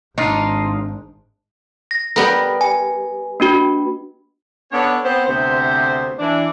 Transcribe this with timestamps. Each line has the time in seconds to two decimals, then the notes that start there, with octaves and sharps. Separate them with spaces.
0.18 G#1 D4 D#4 F4
1.91 A#6
2.16 G3 B3 A#4
2.61 G#5
3.40 A#3 D4 F#4
4.72 B3 D4 A4 C#5
5.04 B3 C4 C5
5.26 D2 C3 B3 C5
6.19 E3 D4